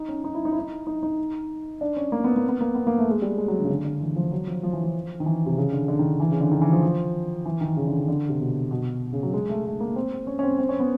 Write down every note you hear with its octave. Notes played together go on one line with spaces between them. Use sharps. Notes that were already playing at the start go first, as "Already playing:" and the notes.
Already playing: D#4
C#4
D#4
E4
D#4
E4
D#4
D#4
D#4
D4
C#4
A#3
B3
A#3
B3
A#3
B3
A#3
A3
G#3
G3
G#3
F#3
D3
C#3
D3
D3
E3
F3
F#3
F3
F3
E3
F3
D#3
E3
C3
C#3
D3
D3
D#3
E3
C#3
D3
D#3
E3
F3
F3
E3
D#3
C#3
D3
D#3
D3
C3
B2
B2
C#3
F#3
G#3
A3
A3
A#3
C4
C#4
C#4
C4
C4
C#4
B3